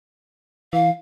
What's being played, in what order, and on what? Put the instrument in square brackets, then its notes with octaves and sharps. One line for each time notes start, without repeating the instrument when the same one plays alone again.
[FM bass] E3 [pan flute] F5